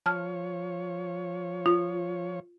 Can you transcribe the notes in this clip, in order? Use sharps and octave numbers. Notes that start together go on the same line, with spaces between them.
F3 C#5 A5 F6
F4